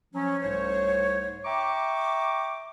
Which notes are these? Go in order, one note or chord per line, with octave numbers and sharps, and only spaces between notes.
F3 F#3 C#4
C2 G#2 A3 C5 C#5
E5 G5 A#5 C#6 D6